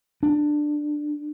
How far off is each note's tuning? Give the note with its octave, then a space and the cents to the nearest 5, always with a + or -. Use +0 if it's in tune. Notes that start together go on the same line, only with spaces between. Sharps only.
D4 +15